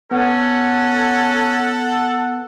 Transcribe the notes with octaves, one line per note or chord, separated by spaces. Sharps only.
B3 C#4 A4 F#5